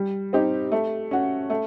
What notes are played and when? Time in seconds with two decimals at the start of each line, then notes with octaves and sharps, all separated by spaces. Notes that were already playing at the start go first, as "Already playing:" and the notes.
Already playing: G3
0.33 C4 D#4 G4
0.72 A3
1.11 C#4 F#4
1.50 A3